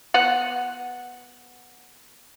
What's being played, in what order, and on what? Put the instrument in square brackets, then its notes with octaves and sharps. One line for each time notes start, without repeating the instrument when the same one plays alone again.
[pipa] B3 F#5